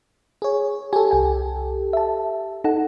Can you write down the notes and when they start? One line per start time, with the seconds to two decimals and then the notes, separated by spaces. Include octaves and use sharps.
0.42 G#4 C#5
0.93 G4 A4 G#5
1.11 C2 G5 G#5
1.93 E5 A5
2.64 D#4 A4 F#5